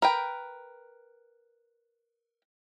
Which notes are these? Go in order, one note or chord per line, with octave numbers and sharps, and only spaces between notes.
A#4 B4 G5